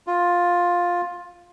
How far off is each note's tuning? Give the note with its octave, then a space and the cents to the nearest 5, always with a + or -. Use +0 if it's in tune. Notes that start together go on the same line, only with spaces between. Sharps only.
F4 +10